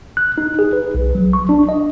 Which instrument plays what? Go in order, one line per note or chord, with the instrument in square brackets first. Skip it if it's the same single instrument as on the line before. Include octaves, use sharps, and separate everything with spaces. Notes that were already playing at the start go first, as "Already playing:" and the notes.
[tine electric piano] F#6
D#4
G#4
B4
B1
F#3
C#6
D4
D#5